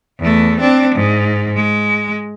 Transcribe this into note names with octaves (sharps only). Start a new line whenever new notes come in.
E2 A3
C4 D4
G#2
G#3